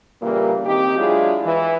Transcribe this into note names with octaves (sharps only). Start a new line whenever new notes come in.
A#2 C#3 E3 G3 A#3
D#3 C4 D#4 G4
F#3 G#3 D4 E4 F4 G#4
E3